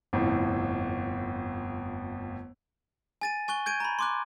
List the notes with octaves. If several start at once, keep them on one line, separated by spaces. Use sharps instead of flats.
G1 F2 A2
G#5 A6 D#7
G#5 C#6 F#6 G7
G6 G#6 D7 D#7
A#5 B5
C6 D6 F#6